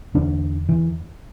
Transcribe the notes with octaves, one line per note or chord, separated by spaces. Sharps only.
E2 D3 D4
E3